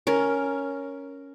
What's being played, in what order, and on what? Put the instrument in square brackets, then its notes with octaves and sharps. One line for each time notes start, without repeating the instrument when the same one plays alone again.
[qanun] C#4 A#4